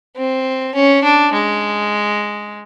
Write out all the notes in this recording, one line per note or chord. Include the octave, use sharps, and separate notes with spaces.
C4
C#4
D4
G#3